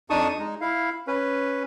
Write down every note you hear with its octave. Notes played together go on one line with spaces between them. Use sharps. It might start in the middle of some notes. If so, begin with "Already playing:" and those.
F2 D4 D#4 A5 C#6 D#6
G#3 D#4
E4 F5
C#4 B4